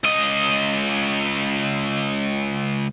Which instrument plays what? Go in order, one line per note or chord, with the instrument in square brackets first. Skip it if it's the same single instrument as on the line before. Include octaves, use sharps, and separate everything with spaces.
[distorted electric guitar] C#2 D#5